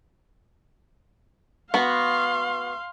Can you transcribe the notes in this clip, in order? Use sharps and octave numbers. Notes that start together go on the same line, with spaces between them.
B3 F#4 F5 C6